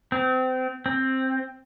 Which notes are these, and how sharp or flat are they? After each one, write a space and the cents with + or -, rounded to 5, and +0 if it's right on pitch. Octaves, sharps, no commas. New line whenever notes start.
C4 -30
C4 +10